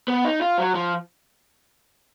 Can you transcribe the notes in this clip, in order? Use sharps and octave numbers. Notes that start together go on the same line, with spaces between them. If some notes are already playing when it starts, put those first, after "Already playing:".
B3
D#4
F4
F#3
F3